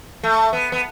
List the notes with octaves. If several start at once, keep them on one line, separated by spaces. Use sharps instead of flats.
A3
B3
B3